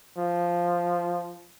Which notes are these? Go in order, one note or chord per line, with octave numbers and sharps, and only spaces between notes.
F3